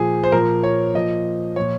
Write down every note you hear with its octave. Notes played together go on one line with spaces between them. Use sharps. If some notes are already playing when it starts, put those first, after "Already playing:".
Already playing: A#2 F3 G#4
C5
A#2 F3 A#4
C#5
A#2 F3 D#5
A#2 F3 C#5